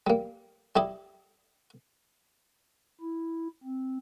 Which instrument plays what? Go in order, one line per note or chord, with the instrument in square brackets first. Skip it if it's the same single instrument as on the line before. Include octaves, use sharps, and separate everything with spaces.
[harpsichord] G3 A#3
G3 E4 G4 D#5
[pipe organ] E4
C4